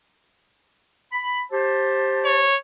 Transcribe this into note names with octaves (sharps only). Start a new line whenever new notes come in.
B5
G4 C5 A5
C#5